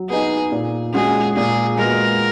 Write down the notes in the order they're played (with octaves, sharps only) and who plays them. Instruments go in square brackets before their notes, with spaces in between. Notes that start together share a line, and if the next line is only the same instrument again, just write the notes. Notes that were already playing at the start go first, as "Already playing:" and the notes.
Already playing: [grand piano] F#3
[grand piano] B3 D#4 [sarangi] G#4
[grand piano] A#2
[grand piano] G#3 C#4 F#4 [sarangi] G#4
[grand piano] A#2 [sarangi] G#4
[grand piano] G#3 B3 F#4 [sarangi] A#4